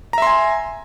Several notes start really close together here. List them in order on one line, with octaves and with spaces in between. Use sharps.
A#5 E5 C6 G#5